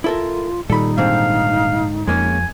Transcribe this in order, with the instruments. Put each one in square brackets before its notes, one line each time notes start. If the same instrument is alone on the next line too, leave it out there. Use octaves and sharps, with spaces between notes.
[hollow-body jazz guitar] E4 A4 A#4 [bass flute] F4
[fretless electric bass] A#2 D#3 G3 [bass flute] D#4 [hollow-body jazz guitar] A4 B5
[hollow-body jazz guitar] G#2 D3 C4 [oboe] F5
[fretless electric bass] F2 [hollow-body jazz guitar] G#3 A#3 C#4 [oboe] G#5